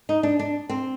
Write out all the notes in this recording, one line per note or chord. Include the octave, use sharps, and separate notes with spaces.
D#4
D4
D4
C4